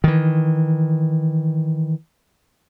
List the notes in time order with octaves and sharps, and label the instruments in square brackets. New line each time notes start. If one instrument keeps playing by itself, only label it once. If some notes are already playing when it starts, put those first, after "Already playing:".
[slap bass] D#3 E3